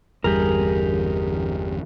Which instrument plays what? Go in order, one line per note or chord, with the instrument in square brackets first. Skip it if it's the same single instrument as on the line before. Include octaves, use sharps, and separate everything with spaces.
[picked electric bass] G1 E2 G3 [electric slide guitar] G4 G#4 A#4